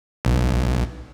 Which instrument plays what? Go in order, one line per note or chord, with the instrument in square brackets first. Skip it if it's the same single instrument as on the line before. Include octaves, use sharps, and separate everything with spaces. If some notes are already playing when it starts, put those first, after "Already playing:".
[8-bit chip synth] B1